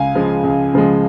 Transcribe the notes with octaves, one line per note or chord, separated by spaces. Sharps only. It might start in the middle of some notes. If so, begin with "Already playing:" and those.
Already playing: C#2 F5 G#5
C#3 F3 G#3
C#2
C#3 F3 G#3